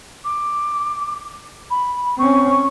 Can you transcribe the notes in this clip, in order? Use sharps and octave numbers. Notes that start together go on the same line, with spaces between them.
D6
B5
C4 C#4 C#6